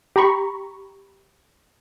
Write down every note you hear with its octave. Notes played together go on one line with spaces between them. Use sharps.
G4 A#5 B5 C#6